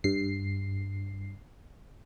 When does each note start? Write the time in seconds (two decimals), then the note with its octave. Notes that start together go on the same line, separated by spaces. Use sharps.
0.04 G2 C7